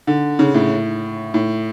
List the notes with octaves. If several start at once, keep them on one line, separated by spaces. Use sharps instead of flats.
D3
C#3
A2
A2